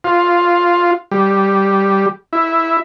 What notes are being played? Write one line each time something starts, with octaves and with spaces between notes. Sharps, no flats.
F4
G3
E4